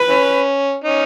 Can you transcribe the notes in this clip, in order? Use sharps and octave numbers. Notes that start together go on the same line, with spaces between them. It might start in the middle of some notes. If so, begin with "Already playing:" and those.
Already playing: B4
E3 C#4
C#4 D#4